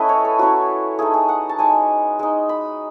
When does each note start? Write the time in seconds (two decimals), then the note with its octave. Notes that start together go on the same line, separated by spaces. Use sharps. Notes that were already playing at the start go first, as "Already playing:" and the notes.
Already playing: A3 C#4 E4 B4 D#5
0.09 C#5
0.25 A4
0.39 F#3 C#4 E4 F#4
0.99 A3 D#4 G#4
1.14 G#4
1.29 F#5
1.49 A5
1.58 G#3 D#4 G#5
2.19 G#3 D#4
2.49 B5